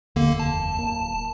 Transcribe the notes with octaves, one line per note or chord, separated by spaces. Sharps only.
F1 D#2 D3 A#3
A5
D1 A#3